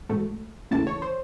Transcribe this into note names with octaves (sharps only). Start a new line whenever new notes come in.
A1 G#2 F#3 A3
D#2 C#3 E3 A3 A5
C#5
C5